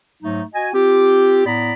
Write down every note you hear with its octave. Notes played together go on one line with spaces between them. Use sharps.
G#2 F#3 A3 D#4
F#4 D#5 G#5
C4 F4 G4
A2 B3 D5 A#5 B5